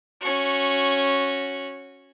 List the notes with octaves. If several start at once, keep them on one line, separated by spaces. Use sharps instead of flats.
C#4 F#4